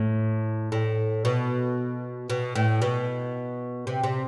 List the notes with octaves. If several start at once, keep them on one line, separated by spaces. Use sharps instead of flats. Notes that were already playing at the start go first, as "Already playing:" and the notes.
Already playing: A2
A2
B2
B2
A2
B2
C3
C3